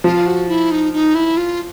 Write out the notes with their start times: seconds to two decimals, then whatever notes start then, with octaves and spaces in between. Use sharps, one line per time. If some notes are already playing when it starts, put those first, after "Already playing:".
0.04 F3 F4
0.27 F#4
0.48 E4
0.71 D#4
0.93 D#4
1.15 E4
1.37 F4